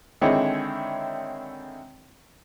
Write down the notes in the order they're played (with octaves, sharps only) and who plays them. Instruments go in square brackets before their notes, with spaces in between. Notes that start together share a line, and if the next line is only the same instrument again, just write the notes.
[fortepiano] D3 D#3 G#3 C4 E4 C#5